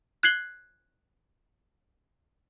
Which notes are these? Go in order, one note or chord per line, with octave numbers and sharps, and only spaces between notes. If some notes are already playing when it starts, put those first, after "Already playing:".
F#6 G#6 C7 F#7 G7